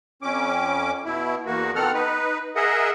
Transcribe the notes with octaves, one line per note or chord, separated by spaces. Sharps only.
F2 C#4 D6
B2 E4
E2 A#3 F#4
B2 D#3 C4 A4 F#5 F6
D#4 B4
G#4 A#4 D#5 E5 F#5